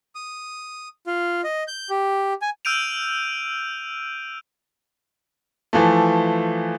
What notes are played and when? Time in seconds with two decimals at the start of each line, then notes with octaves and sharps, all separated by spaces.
0.15 D#6
1.07 F4
1.44 D#5
1.68 G6
1.90 G4
2.42 G#5
2.65 E6 F6 G6 D7 D#7 F7
5.73 E3 F3 A3